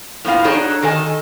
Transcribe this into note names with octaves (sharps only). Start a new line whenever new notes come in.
A2 F3 B3 C4 F5
D4 D#4 F#4 G#4 A4 C#5
D#3 A4 D#5 G#5